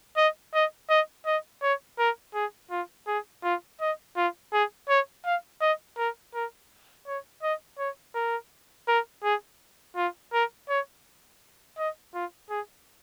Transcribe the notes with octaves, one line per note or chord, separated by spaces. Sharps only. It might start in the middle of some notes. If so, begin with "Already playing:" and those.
D#5
D#5
D#5
D#5
C#5
A#4
G#4
F4
G#4
F4
D#5
F4
G#4
C#5
F5
D#5
A#4
A#4
C#5
D#5
C#5
A#4
A#4
G#4
F4
A#4
C#5
D#5
F4
G#4